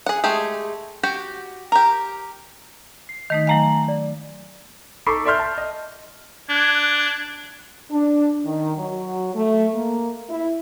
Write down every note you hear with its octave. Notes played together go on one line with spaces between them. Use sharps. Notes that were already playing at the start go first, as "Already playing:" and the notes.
G#4 F#5
G#3 A3 G4 G#4
F#4 G4 G5
G4 A#4
C7
D#3 A3 D#4 D#5 B6
F#3 A3 F5 G#5 A#5 F#7
D5
D#4 A4 B5 C#6 D6 C7
A4 D5 E5 C6 F6 G6
A5
D#5
D4 F#6 G#6
D4
D#3
F#3
A3
A#3
E4